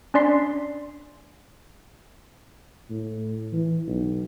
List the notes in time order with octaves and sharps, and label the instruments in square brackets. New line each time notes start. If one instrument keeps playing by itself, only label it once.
[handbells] C#4 D4 D5 C6 B6 C7
[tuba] A2
E3
B1